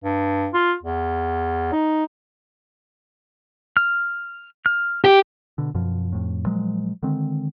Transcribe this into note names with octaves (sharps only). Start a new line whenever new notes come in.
G2
F4
E2
D#4
F6
F6
G4
B2 D3
F#2 B2 F3
F2 A2
A#2 F3 F#3 G#3
D3 D#3 G#3 C4